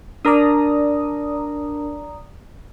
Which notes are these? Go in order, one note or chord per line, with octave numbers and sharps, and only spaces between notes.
D4 A#4 D5 A#5 D#6